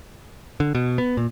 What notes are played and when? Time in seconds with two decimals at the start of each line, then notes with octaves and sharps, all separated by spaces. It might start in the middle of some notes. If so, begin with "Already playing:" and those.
0.60 D3
0.75 B2
0.98 B3
1.17 A#2